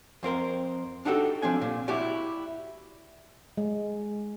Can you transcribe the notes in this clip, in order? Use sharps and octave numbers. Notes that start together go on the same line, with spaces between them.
F2 C4 A#4 C6
D4 D#4 F#4 G4 A4
F3 C4 D4 G#5
A#2
E4 F#4 G4 D5
G#3